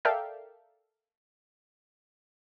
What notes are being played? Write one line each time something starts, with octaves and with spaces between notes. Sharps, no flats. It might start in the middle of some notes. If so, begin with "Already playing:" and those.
A4 A#4 D5 E5 F5 G5